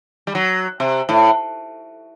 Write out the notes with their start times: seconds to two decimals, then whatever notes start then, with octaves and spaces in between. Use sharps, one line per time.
0.27 G3
0.35 F#3
0.80 C3
1.09 A2